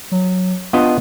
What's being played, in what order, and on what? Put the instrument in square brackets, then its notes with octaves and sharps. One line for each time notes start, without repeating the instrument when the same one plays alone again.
[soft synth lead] F#3
[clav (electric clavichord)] B3 F4 D#5 [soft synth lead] D4